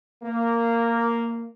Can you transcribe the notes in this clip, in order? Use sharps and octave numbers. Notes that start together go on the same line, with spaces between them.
A#3